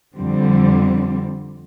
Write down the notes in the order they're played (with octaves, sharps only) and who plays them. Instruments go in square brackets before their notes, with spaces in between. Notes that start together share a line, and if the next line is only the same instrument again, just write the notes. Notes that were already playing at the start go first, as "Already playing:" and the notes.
[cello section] F2 D3 G3 C4